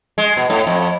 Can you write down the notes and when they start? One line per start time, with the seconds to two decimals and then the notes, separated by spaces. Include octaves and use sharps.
0.18 G#3
0.37 B2
0.50 A2
0.67 F2